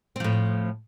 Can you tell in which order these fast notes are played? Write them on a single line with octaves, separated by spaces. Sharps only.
C4 F3 A2